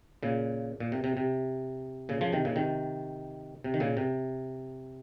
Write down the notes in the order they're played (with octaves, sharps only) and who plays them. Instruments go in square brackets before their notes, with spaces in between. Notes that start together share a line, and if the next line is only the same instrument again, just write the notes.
[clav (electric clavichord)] A#2 C#3
A#2
C3
C3
C3
A#2 C#3
C#3 F3
C3 D#3
A#2 C#3
C3 D#3
C3
D#3
A#2 C#3
C3